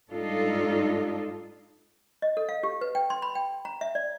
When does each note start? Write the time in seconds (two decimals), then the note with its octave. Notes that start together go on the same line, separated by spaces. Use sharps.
0.10 G#2 G3 D4 D#4 F4 A4
2.22 D#5
2.37 A4
2.49 F5
2.63 G4
2.81 B4
2.95 G5
3.10 C6
3.22 B5
3.35 G5
3.65 A#5
3.81 E5
3.95 D5